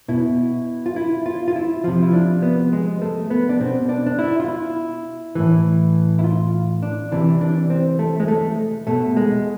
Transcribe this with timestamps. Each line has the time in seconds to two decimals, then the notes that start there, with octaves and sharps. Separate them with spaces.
0.08 B2 E4
0.86 F4
0.96 E4
1.26 F4
1.48 F4
1.56 E4
1.84 C3 F3 F4
2.03 E4
2.13 D4
2.43 B3
2.73 G#3
3.02 A3
3.30 B3
3.49 D4
3.60 B2 C4
3.89 D4
4.06 D4
4.19 E4
4.40 F4
4.48 E4
5.35 A2 E3
6.19 E4
6.24 F4
6.83 D4
7.12 C3 E3 D4
7.41 D4
7.70 C4
7.99 A3
8.20 G#3
8.28 A3
8.87 B2 A3
9.17 G#3